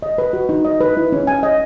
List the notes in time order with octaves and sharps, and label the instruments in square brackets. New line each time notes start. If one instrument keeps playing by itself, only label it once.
[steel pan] D#5
B4
F#4
D#4
D#5
B4
E4
C#4
G#5
D#5